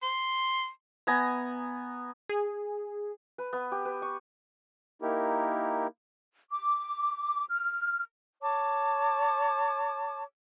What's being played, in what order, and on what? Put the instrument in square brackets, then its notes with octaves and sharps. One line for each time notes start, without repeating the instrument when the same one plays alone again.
[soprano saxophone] C6
[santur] B3 G#5 A#5
[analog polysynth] G#4
[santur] B4
B3
G4
B4
C#6
[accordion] A#3 D#4 E4 G4 A#4
[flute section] D6
F6
C#5 A5 C#6 D6